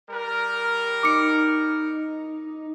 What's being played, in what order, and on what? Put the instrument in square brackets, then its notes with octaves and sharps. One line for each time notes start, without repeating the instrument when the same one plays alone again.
[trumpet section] G3 A#4
[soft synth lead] D#4 [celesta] D6 C#7